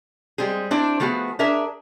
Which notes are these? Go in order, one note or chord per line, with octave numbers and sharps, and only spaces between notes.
G3 G#3 C4 G#4
C4 D4 E4 D5
F3 A3 B3 F#4 G#4
D4 G#4 A#4 E5